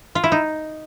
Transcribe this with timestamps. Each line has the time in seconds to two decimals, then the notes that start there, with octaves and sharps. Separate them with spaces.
0.15 F4
0.24 E4
0.32 D#4